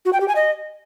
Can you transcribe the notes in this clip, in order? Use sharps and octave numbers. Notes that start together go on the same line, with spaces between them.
F#4
G5
G4
G#5
D#5